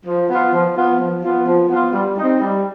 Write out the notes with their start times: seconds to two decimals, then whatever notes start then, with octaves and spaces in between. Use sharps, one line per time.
0.05 F3
0.29 B3 F4
0.52 F3
0.75 B3 F4
0.98 F3
1.22 B3 F4
1.46 F3
1.69 B3 F4
1.92 G3
2.15 D#4
2.21 C4
2.40 G3